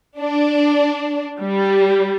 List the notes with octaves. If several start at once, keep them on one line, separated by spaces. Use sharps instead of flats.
D4
G3